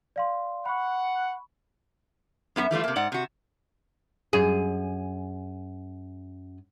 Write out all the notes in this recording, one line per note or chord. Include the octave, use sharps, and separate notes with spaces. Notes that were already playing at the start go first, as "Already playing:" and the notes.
D5 F5 C6
F#5 B5 C#6
F#2 B3 F4 E5
E3 G3 A3 F4
C3 A#3
G#2 D5 F#5
C3 F#4
F#2 G#4